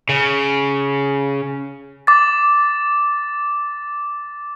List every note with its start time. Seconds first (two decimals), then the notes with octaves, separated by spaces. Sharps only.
0.09 C#3
2.07 D6 A6